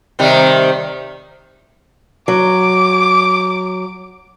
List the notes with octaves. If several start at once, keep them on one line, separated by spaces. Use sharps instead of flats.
C3 D#3 G3
F#3 D6